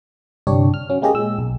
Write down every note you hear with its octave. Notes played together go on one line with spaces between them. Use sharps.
G1 C2 D4 G4 C#5
F6
F#3 C#4
G#3 A#3 C#4 G4 G#4 D#5
A#2 G#3 E6
B1